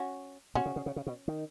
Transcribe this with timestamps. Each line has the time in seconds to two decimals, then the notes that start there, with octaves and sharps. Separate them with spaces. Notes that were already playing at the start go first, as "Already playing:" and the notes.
Already playing: C#4 F#4
0.55 B2 C#4 F#4
0.66 C#3
0.76 C#3
0.86 C#3
0.96 C#3
1.07 B2
1.28 D#3